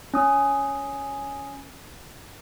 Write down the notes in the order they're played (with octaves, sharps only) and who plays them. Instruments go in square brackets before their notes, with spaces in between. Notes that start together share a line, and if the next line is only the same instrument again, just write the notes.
[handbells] C#4 D#6